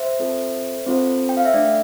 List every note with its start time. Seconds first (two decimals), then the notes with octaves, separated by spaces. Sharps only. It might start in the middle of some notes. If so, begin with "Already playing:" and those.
Already playing: C5 E5
0.20 C4 F4 A4
0.86 C4 F4 A4 C5
1.29 G5
1.37 F5
1.45 E5
1.54 A3 D4 A4 D5